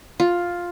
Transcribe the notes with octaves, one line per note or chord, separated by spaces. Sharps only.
F4